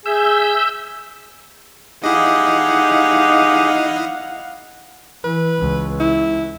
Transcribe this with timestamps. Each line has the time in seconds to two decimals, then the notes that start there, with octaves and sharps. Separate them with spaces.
0.06 G#4 E5 E6 G6
2.04 D#4 E4 G4 G#4 D#5 F5 F#5
5.24 E3 B4
5.59 C#2
6.00 E4